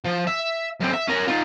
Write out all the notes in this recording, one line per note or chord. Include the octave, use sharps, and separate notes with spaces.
F3
E5
F#2 C4
E5
C#4 A#4
D#4 F4